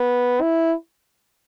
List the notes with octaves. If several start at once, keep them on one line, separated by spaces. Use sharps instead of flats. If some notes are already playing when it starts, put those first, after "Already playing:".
Already playing: B3
E4